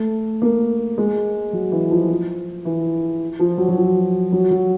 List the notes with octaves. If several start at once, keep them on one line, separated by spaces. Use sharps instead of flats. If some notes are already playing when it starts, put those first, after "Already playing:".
Already playing: A3
A#3
G#3
F#3
E3
F3
F3
E3
F3
F#3
F#3
F3
F#3
F#3